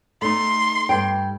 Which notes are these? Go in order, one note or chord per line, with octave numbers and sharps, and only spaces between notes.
A3 D#4 C6
G2 G5